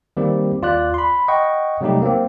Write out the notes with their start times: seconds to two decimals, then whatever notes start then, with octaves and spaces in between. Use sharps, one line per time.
0.17 D#3 G3 A#3 C4 G4
0.62 D#2 F4 D5 F#6
0.94 B5 C6
1.28 D#5 F#5 G5 C#6
1.81 C3 F#3 G3 A3 D#4 G4
2.02 A#3 C4